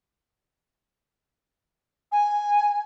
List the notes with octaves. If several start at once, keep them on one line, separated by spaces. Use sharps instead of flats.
G#5